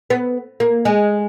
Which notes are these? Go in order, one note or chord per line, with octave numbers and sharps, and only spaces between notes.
B3
A#3
G#3